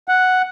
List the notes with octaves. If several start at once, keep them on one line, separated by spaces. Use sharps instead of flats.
F#5